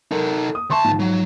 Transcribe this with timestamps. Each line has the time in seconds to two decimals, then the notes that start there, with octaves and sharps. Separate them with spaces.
0.11 D#4 A4 A#4
0.55 D#6
0.70 D2 E5 A5 C6 C#6
0.84 G#2 F3
0.99 F#3